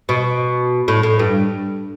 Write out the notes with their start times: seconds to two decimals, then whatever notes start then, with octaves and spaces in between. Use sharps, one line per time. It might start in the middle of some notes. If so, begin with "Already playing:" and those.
0.09 B2
0.88 A2
1.03 A2
1.19 G2